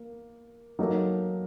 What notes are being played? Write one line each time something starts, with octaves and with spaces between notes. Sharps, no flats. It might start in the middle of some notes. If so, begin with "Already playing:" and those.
Already playing: A#3
F#3 A#3 D#4 A4